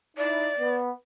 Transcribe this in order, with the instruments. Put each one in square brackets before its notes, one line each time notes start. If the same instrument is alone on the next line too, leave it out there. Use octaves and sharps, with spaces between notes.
[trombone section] D#4 E4 [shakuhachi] D5
[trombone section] B3